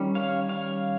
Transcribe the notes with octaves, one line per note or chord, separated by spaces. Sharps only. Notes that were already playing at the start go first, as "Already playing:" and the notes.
Already playing: D#3 G3 C#4
C#5 F5
C#5 F5